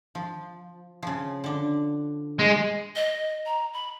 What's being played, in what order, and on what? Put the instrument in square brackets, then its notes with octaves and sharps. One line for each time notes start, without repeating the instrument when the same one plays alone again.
[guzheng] F3
C#3 F3
D3 D4
[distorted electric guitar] G#3
[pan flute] D#5
A#5
B5